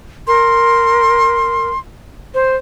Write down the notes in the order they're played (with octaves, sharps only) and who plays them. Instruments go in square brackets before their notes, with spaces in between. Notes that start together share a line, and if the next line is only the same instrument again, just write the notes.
[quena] A#4 [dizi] C6
[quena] C5